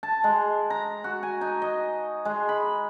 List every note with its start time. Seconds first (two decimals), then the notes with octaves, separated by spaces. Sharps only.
0.03 A5
0.24 G#3
0.70 A#5
1.04 F#4
1.23 G#5
1.41 D#4
1.62 D#5
2.25 G#3
2.49 B5